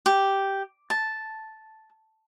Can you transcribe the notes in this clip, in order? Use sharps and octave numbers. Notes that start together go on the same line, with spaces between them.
G4
A5